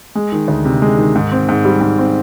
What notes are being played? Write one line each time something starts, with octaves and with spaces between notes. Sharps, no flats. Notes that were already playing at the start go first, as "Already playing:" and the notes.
G#3
D#3
D2
C3
G#3
D#3
G#2
C4
G#2
G3
G#2
C4